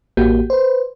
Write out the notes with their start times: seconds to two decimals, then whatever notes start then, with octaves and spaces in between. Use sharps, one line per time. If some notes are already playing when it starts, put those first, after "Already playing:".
0.17 A1 A#3 F#4 G4 G6
0.50 B4 C5